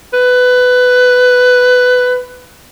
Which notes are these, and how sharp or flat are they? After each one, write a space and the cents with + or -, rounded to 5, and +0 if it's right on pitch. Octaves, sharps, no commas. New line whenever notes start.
B4 +15